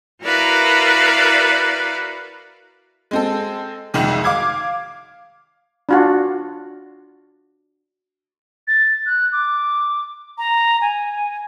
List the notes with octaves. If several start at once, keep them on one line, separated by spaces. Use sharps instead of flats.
E4 F#4 A#4 B4 D5 F5
G#3 C4 A4
C2 F2 D#3 G#3
F5 D6 G#6
D4 F4 F#4
A6
F#6
D6
A#5
G#5